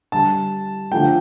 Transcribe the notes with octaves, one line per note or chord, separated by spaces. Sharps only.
D3 G3 A5
D3 F3 A3 G5